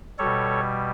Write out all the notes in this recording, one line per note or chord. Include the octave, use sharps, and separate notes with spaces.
B2 G3 A4 C#5